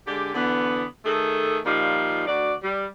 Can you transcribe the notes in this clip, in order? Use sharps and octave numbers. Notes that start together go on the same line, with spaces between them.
D3 G#3 G4
D3 E3 B3
D#3 A3 G#4 A4
A#2 F3 G3 D#4 F5
D2 F#4 D5
G3